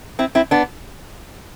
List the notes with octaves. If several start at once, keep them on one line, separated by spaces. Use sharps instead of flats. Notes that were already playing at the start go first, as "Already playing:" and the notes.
C4 E4
C4 E4
B3 D4